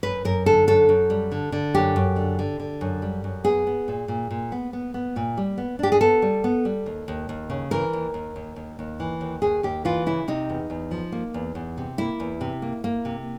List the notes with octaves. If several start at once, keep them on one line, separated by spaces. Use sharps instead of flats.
F#2 B4
F#2 A#4
D3 A4
F#2 A4
F#2
G3
D3
D3
F#2 G4
F#2
D3
D3
D3
F#2
G3
F#2
B3 G#4
B3
A#2
A#2
A#2
B3
B3
B3
A#2
G3
B3
D4 G4
G#4
B3 A4
G3
B3
G3
D#2
D#2
D#2
C#3
E3 A#4
D#2
D#2
D#2
D#2
D#2
E3
D#2
D#2 G#4
D#2 G4
E3 F4
C#3 E4
C3 D#4
E2
E2
F3
A#3
E2
E2
C3
A#3 E4
E2
C3
A#3
A#3
C3